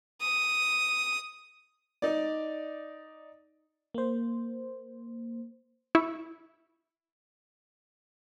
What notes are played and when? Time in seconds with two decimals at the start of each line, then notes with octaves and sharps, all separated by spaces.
0.21 D#6
2.02 D#4 D5
3.94 A#3 C5
5.95 E4 C#6 E6